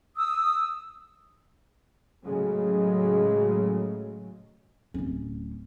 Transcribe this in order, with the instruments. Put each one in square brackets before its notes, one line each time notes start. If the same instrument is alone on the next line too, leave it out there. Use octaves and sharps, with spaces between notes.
[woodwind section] D#6 E6
[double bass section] A2 C#3 F#3 G#3
[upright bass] D1 C#4